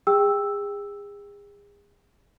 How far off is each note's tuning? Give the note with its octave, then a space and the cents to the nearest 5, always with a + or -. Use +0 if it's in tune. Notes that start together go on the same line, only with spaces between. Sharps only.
G#4 -35 G5 +10 E6 +0